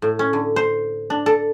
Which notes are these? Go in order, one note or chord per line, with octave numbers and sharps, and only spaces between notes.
A2
C#4
D3
C5
D4
A4